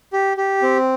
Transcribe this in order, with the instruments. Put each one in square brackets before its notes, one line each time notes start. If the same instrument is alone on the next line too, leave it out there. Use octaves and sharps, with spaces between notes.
[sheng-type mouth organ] G4
G4
C4